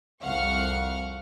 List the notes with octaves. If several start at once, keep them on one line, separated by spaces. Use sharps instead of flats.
C2 F2 F5 F#5 C#6 F6